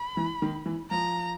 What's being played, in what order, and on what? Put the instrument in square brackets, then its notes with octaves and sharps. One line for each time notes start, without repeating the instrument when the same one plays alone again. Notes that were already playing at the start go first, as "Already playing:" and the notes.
Already playing: [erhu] B5
[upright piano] E3
D#3
E3
[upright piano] F3 [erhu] A#5